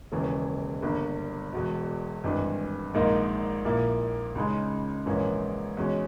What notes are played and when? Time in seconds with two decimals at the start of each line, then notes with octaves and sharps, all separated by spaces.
0.12 E1 D#2 C#3 E3
0.82 G1 G2 G3 A#3
1.53 E1 E2 B2
2.24 G#1 G2 E3
2.94 A#1 G#2 D#3 A#3 D#4
3.65 A#1 A#2 A#3 E4
4.35 C#2 C#3 G#3 D#4
5.06 A#1 G#2 E3 A#3 C#4
5.77 E2 B2 G#3 C#4